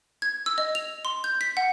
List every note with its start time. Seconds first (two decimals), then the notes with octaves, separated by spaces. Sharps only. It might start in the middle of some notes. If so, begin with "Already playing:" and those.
0.22 G#6
0.46 E6
0.58 D#5
0.75 F7
1.05 C6
1.24 G6
1.41 B6
1.57 F#5